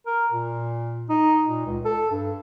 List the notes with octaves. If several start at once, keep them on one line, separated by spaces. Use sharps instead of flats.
A#4
A#2
D#4
A#2
C#2
A4
G2